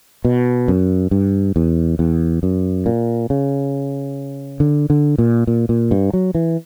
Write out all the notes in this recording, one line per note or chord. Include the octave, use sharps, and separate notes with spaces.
B2
F#2
G2
E2
E2
F#2
A#2
C#3
D3
D3
A#2
A#2
A#2
G2
F#3
E3